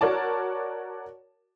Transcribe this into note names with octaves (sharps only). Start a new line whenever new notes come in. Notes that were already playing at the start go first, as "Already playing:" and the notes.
F#4 A#4 C#5 D5 A5